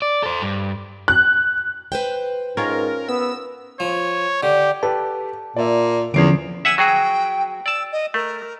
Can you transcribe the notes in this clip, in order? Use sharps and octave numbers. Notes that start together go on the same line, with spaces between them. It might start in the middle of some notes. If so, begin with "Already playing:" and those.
D5
A4 C5
G2
F#6
B4 C5 G5
G#2 C#4 F4 A#4
B3 E6
F3 C#5
D3 G4
G4 A4 B4 A5
A#2 D5 E5
E2 D3 F3 C#4 G#6 C7 D7
E5 F#5 G#5 E6
F#3 F#4 G#4 G5
D5 A5 E6
D#5
A3 A#4